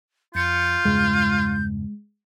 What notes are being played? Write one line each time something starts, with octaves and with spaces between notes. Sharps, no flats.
F2 F4 G6 A6 C#7
E2 G2 C#3 G#3